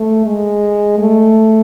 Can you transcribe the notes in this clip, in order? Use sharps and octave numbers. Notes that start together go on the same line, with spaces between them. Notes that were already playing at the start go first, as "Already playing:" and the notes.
Already playing: A3
G#3
A3